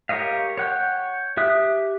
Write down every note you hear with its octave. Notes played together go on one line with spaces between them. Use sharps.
G4 A#4 C#5 D#5 F5
C#5 F#5 G5
G4 E5 D#6 F#6